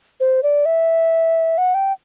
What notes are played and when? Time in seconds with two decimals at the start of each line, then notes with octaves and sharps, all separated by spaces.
0.20 C5
0.43 D5
0.66 E5
1.58 F#5
1.74 G5